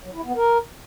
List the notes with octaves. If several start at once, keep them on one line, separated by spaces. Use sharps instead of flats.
F#3
E4
B3
A#4